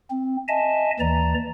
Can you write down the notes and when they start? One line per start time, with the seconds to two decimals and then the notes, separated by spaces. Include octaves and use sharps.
0.10 C4
0.48 D#5 E5 G#5 A5
1.00 D#2 E3 D5 A#5